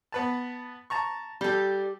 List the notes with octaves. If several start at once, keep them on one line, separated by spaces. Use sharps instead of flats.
B3 B4 A5
A5 A#5 C#6
G3 G4 A4